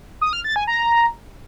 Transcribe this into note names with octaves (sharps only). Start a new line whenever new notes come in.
D#6
F6
A6
G#5
A#5